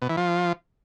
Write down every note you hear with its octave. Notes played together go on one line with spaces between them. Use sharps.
B2
E3
F3